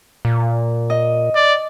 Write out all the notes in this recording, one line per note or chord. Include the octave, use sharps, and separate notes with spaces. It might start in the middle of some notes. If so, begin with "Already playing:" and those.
A#2
D#5
D5